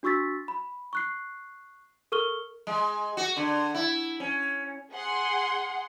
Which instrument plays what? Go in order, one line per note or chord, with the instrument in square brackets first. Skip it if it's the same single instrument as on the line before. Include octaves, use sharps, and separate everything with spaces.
[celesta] D4 F#4 C#6 E6 A6 B6
B5
C#6 F#6 C7
A4 A#4 C#6 F6 G7
[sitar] G#3
F#4
D3
E4
C#4
[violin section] G#4 F#5 C6